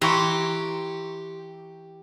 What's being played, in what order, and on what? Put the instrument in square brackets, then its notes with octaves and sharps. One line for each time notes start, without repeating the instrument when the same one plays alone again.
[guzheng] E3 E4 A#5 [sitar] G4 [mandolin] C6 C#6